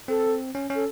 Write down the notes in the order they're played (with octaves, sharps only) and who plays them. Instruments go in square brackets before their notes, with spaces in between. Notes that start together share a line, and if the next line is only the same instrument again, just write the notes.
[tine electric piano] C4 [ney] A4
[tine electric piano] C#4
C#4
[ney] A4